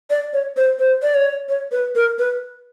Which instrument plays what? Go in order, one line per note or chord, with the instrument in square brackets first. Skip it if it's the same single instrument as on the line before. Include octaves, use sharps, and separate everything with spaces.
[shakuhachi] D5
C#5
C5
C5
D5
C#5
C#5
B4
A#4
B4